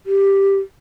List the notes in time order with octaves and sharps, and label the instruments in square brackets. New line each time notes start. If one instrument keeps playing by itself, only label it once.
[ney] G4